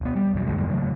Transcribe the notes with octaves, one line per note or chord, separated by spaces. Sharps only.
E1 B3
G3
B1 E2 D#3 F#3
C#2 G2 D3 G#3
E2 G2 E3 A#3
C#3 F#3 A3